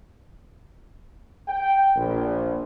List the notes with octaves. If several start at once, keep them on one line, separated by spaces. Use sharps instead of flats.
G5
A#1